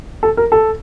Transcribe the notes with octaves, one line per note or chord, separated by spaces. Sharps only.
A4
A#4
A4